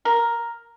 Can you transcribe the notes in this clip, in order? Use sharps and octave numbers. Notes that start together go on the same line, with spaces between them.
A#4